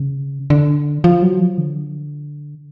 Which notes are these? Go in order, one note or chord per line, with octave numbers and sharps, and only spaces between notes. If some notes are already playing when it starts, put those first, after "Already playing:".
Already playing: C#3
D3
F3
F#3
F3
D3